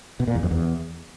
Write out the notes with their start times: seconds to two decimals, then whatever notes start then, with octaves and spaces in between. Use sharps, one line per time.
0.20 B2
0.27 A#2
0.35 E2
0.43 F2
0.51 E2